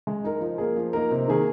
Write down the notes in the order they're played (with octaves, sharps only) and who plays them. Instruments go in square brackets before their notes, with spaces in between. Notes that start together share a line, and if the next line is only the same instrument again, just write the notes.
[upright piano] G#3
D#4 A#4
F3
A#3 G#4
F3
A#3 D#4 A#4
C3
D#3 A#3 G#4